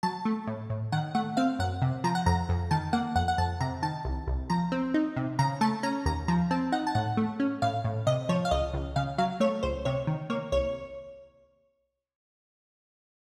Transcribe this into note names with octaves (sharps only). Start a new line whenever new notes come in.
F#3 A5
A3
A2
A2
D#3 F#5
A3 F#5
C4 F5
F#2 F#5
C3
F3 A#5
F#5
F2 A#5
F2
D#3 A5
A#3 F#5
F2 F#5
F#5
F2 A5
C3 A#5
D#3 A5
C2
C2
F3 A#5
C4
D#4
C3
C#3 A#5
A3 A5
C#4 A#5
D#2 A#5
F3 A#5
C4 A5
D#4 F#5
A5
A2 F#5
A3
C#4
A2 F5
A2
C3 D#5
F3 C#5
F5
C#2 D#5
C#2
C#3 F5
F#3 F5
A3 C#5
C#2 C5
C3 C#5
D#3
A#3 C#5
C2 C#5